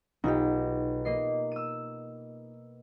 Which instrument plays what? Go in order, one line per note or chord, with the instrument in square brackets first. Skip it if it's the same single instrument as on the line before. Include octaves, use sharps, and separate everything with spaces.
[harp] B1 [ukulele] D#4 F4 G4
[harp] A#3 D#5 C7
E6 D#7